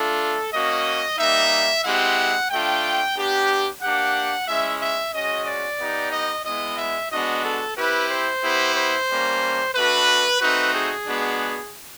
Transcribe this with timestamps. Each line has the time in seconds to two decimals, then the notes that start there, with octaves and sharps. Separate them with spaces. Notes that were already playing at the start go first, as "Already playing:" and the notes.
Already playing: A3 D4 F4 A4
0.53 A#3 C#4 F#4 D#5
1.18 G3 A#3 D#4 E5
1.84 G#3 C4 E4 G4 F#5
2.50 A3 D4 F4 G5
3.15 B3 D4 G4
3.82 A#3 D4 G4 F#5
4.47 G#3 C#4 E4 E5
4.80 E5
5.13 G#3 C#4 F#4 D#5
5.46 D5
5.79 B3 D#4 G4
6.12 D#5
6.45 G#3 B3 E4 D#5
6.78 E5
7.12 G#3 B3 D4 F#4 D#5
7.44 A4
7.76 C4 E4 G4 B4
8.10 C5
8.42 B3 E4 G4
8.76 C5
9.09 G3 A#3 C#4
9.74 A3 D4 F#4 B4
10.40 A3 C4 D#4 F#4 B4
10.73 G#4
11.06 G#3 B3 D4 F#4